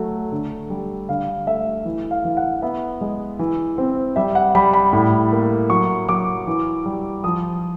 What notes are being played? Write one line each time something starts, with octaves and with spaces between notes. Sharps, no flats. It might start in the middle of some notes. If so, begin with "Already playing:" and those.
Already playing: F#3 A3
D3
G3
D3 F5
A3 E5
E3
F5
E3
F#5
B3 E5
G#3
E3
C4
G3 E5
F#5
G3 B5
B5
A2
A#3
F#3 C#6
F#3 D6
E3
G3
F3 D#6